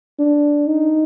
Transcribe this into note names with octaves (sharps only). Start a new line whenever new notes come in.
D4
D#4